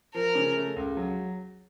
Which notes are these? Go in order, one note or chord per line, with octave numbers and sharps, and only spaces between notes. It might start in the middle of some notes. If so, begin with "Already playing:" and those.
F3 A#4
C#3
A3
C#2
F#3